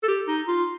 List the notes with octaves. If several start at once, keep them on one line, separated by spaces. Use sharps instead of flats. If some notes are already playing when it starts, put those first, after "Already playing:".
A4
G4
D#4
F4